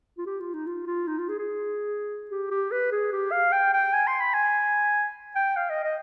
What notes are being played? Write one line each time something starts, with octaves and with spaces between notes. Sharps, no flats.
F4
G4
F4
D#4
F4
F4
D#4
F4
G#4
G#4
G4
G4
B4
G#4
G4
F5
G5
G5
G#5
C6
B5
G#5
G5
F5
D#5
D#5